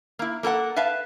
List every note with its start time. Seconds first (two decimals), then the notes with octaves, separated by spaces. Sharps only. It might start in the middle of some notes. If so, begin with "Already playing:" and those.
0.19 A#3 E4
0.43 A#3 A4 A#4 F#5
0.76 B4 E5 F5 A5